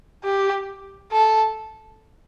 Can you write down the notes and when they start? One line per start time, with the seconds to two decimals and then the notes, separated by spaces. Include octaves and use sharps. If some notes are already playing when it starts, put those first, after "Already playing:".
0.23 G4
1.12 A4